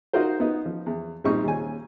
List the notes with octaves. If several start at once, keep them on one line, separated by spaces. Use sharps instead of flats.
D#4 F4 F#4 A#4 C5
B3 D#4
F3
E2
A#1 G3 C4 D#4 C#6
D#2 C#3 G#5